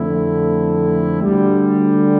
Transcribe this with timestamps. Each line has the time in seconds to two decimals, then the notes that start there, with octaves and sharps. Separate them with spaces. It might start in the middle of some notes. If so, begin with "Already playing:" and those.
Already playing: F2 D3 A3 C4 E4
1.22 D2 D3 G3